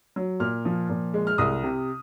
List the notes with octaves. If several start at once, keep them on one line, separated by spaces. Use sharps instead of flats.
F#3
A#2 F6
F3
A#2
G#3
F6
C2 D#6
C3